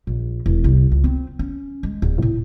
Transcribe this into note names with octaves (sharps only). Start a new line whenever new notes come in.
A#1
E1
C2
C#2
C4
C#4
G#3
D1
A2